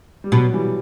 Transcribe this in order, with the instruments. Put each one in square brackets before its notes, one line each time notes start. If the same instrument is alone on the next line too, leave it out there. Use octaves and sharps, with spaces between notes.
[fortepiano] G3
[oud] B2 [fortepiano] F#3
[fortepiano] E3 G3